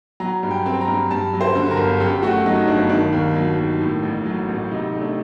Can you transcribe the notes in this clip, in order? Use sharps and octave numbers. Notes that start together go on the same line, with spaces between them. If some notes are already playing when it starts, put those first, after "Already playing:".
F#3 A#5
G2
G5
C4
A#5
G2
G2 A5
F#3
C5
D3
A#4
G1
F#2 G4
A3 F#4
F#3 D#4
G1 D4
D#3 D4
D#2
F#3
D#2
A2
A1
F#3
A1
C3 D#4
A3
D4